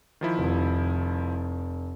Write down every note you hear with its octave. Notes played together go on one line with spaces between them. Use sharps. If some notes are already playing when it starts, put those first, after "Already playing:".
D#3 F3 E4
F1